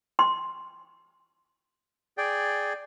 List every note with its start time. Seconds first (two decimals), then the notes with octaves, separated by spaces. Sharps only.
0.19 C6
2.18 G#4 D5 G5